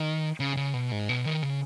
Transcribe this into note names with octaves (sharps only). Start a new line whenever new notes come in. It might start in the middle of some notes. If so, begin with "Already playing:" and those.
Already playing: D#3
C#3
C#3
B2
G#2
B2
D#3
C#3